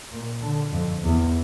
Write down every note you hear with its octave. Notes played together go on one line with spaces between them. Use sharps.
A#2
D3
F2
E2